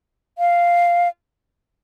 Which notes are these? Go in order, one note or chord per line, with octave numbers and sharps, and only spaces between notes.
F5